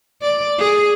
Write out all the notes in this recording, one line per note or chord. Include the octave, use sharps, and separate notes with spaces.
D5
G#4